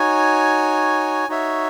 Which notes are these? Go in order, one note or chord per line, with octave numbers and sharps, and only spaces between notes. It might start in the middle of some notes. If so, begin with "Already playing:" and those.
Already playing: D#4 F#4 C#5 G#5
D#4 F#4 C#5 E5